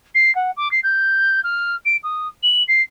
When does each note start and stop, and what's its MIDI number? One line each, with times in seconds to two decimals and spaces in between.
0.14 0.33 96
0.35 0.50 78
0.56 0.71 86
0.71 0.80 96
0.83 1.40 91
1.43 1.75 89
1.85 1.96 98
2.03 2.28 87
2.42 2.63 102
2.68 2.82 96